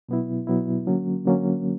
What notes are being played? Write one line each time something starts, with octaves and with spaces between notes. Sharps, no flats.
B2 F#3 B3 E4
B2 F#3 B3 E4
D3 F#3 A#3 C#4
D3 F#3 A#3 C#4